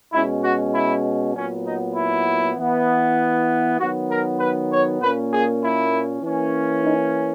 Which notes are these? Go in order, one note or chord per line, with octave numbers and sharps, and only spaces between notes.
B2 G#3 C#4 E4
F#4
E4
A#2 F#3 B3 C#4
D#4
E4
E3 B3
D#3 F#3 B3 F#4
A#4
B4
C#5
A#2 A#3 C#4 B4
G#4
E4
E3 A#3 C#4
D#4